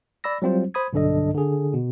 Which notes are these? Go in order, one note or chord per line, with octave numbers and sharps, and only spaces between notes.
D5 B5 E6 A#6
F#3 G3 C4 F4 C5
C5 B5 D#6 G#6
B1 G2 D3 D4 A4 D#5
D3 G#4
B2